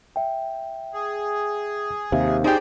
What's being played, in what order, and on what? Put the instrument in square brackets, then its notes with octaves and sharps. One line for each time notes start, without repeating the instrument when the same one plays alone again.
[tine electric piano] E5 G5
[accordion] G#4
[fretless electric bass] D#2 C3 [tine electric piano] E5 F5
[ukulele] D#4 G4 [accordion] G#4 C5 D5